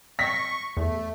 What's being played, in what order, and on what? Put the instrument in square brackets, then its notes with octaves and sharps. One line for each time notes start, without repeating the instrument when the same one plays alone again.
[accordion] C#6 [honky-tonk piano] A#6 B6
[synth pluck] E2 [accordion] A3